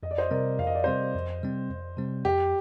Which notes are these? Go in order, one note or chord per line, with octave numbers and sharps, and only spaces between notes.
F2 D#5
D5
C5 D#5
C3 G3 C4 A#4 D5
F2 F5
D#5
D5
C3 G3 C4 C5 D#5
F2
C3 G3 C4
F2
C3 G3 C4
F2 G4